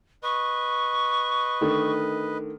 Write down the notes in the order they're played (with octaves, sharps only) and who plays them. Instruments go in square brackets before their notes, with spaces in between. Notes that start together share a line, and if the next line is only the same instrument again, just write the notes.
[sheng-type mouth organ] B4 D#5 [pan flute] C#6
[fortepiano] D3 D#3 A3